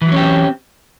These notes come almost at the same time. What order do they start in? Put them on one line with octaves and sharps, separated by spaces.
E3 F#3 C#4 G4 C4